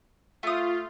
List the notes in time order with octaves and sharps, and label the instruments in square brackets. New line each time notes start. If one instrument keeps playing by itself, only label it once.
[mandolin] A3 D#6 [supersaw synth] F4